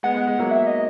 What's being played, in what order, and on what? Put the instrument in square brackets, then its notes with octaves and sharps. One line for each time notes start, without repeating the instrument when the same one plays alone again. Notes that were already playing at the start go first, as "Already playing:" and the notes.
[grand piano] G#3 B3 [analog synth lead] F#5
[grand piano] G#3
G#3
F#3 A#3
[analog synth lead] E5
D#5